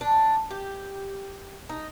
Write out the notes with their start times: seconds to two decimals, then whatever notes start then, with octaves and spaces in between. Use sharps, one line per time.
0.01 D4
0.51 G4
1.69 D#4